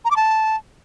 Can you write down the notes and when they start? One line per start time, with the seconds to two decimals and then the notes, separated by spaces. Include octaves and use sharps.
0.05 A#5
0.11 D6
0.16 A5